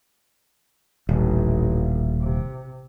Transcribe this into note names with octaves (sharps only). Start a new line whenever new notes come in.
D#1 A1
C3